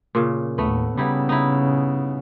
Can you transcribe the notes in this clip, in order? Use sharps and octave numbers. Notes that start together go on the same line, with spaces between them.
A#2 C#3
D#2 A2 A3 B3
C#3 G3 B3 D#4 E4
D#4 E4